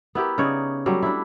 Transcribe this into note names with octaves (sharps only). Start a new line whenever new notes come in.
B3 E4 G4 A#4
C#3 D#4 C#5 D5
F#3 G3 A3
D4 E4